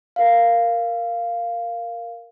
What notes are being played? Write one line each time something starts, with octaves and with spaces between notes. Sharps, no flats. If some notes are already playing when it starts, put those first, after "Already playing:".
A#4 F5